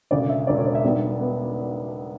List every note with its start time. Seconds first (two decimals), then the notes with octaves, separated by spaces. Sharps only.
0.11 E1 D2 C#3 D5
0.29 E5
0.47 E1 D2 C#3 D5
0.57 C#5
0.66 D5
0.75 E5
0.84 B1 B2 G3 B3 D4
1.20 B3